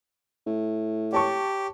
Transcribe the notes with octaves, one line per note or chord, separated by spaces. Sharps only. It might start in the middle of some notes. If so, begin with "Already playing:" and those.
A2
G4 C#5 A5 C#6